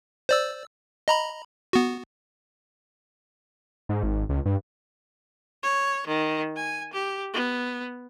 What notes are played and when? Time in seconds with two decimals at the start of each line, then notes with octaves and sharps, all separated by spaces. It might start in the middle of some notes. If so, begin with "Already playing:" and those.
0.29 C5 D5 E6
1.08 D#5 A#5 B5
1.73 B3 F#4
3.89 G#2
4.03 G#1
4.29 C#2
4.46 G2
5.63 C#5
6.07 D#3
6.56 G#5
6.92 G4
7.33 B3